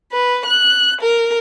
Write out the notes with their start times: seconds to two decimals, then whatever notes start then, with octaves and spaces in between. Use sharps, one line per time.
0.12 B4
0.46 F#6
1.01 A#4